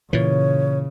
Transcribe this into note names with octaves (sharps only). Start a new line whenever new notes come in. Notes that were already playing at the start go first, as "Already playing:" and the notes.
A#2 C#3 E3 C#5